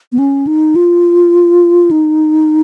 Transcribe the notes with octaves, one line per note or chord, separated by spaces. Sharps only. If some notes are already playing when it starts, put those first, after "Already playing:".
B3
C#4
D#4
F4
D#4